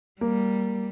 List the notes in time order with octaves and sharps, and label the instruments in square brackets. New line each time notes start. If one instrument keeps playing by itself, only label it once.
[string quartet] G3 [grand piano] A#3